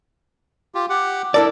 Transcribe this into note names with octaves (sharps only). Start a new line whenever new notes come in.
F4 G4
G4 F#5
D4 E4 A4 A#4 D5